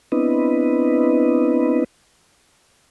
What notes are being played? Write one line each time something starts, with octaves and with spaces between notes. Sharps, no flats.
B3 C4 D4 E4 B4 D#5